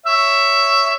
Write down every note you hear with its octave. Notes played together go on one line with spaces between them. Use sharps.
C#5 E5